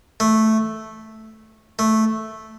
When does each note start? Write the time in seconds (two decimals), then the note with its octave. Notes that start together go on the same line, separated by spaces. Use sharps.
0.20 A3
1.79 A3